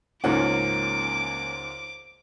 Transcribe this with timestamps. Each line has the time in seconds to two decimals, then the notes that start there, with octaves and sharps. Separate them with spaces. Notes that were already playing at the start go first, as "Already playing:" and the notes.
0.24 C#2 G#2 A#3 C#4 F#5 D6